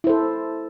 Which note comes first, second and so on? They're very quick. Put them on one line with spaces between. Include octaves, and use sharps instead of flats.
E4 C5 A4